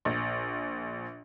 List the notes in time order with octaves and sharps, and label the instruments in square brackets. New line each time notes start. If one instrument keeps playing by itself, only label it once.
[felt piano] A#1